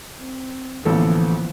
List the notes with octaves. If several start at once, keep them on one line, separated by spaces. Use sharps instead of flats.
C4
A1 D3 E3 F3 A#3 B3 A4